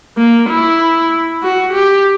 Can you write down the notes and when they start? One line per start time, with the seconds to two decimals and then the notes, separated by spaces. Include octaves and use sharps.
0.18 A#3
0.49 E4
1.43 F#4
1.74 G4